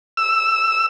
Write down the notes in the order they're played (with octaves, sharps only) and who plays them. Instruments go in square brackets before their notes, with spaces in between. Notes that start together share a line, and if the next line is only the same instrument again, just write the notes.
[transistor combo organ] E6